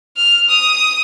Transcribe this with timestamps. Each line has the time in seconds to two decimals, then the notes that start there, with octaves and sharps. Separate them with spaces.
0.17 F6
0.49 D#6